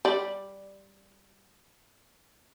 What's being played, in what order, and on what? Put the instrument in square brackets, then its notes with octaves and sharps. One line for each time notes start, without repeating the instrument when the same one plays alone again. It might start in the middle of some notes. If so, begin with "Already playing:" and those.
[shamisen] G3 D5